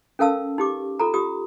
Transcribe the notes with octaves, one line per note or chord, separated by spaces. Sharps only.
C#4 A4 A#4 F5 A5 E6
D#4 G4 D6
F4 A4 A#5
F4 G4 D#6